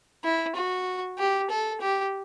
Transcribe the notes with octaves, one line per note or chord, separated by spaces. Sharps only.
E4
F#4
G4
A4
G4